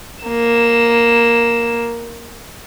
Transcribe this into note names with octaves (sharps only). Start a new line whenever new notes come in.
A#3 E7